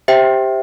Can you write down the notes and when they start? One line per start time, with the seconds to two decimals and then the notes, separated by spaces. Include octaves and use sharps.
0.08 G4 C5 E5 G5